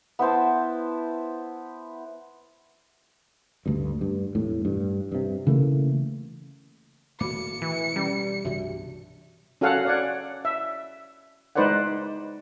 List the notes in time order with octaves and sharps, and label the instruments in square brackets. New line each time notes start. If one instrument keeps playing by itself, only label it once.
[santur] B3 E4 C5 A5
[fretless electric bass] D2 G2
G2
E1 A2
G2
G2 C3
C#3 E3 A3 A#3
[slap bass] D#1 A2 A#3 [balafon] F#4 B5 D6 [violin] C#7
[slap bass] B2 [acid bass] E3
[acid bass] G3 [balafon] C#4
[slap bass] C2 G2 B2 [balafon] E3 F#4 E5
[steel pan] C#4 F#4 A4 F5 F#5
C#5 D5 F#5
E5
G#3 D#4 B4 C5 D5 F#5